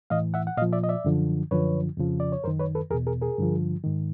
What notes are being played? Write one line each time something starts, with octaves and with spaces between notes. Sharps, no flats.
A2 E3 D#5 F5
E5 F#5
F#5
A#2 F3 D#5 F5
D5 E5
D#5
D5 E5
F#2 D3 F3
F#2 D3 F3 B4 C#5
F2 C#3 F3
D5
C#5
F#2 D#3 A#4 C5
B4 C#5
A4 B4
E2 B2 G#4 A#4
G#4 A#4
G#4 A#4
G2 D3 F3
G#2 D#3